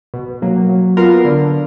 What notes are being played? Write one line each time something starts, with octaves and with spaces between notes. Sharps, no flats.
B2
F#3 A#3
F#3
B3 F4 A#4
D3